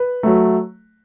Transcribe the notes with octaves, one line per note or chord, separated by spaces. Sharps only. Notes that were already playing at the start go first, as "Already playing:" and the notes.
Already playing: B4
F#3 A3